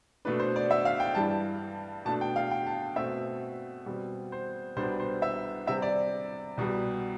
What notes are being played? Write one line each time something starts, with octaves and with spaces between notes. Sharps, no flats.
B2 A3 D4 B4
C5
D5
E5
F5
G5
G2 E3 G3 A5
B2 A3 D4 A5
G5
F5
G5
A5
B2 A3 C4 E5
B2 G3 C4
C5
C2 B2 G3 B3 D4 C5
C5
E5
C3 G3 C4 E5
D5
C2 B2 G3